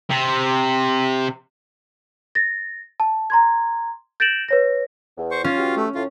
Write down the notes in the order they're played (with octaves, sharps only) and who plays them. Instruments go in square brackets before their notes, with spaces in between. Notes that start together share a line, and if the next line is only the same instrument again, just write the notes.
[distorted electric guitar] C3
[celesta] A6 A#6
A5
A#5 C6 G#6
G6 A6 A#6 D7 E7 F#7
B4 C#5 A#6
[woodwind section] E2
[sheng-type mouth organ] C5 C#6
[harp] C#4 [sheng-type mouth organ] F4
[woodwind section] B2 F#4 G4
[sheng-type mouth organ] A3
[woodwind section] A2 [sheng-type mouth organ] F4